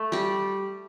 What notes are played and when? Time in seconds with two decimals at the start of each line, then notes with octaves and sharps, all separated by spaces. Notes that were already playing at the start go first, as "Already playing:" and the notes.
Already playing: A3
0.12 G3 G4